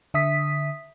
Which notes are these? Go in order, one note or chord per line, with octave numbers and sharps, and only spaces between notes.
D3 E5 D#6 B6